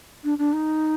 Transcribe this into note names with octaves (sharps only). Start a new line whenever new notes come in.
D4
D4
D#4